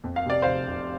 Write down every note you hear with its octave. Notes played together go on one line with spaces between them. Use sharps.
F2
F5
C3 D5
F1 C5 F5
F1